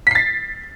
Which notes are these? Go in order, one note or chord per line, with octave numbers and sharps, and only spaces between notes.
A6 B6 C7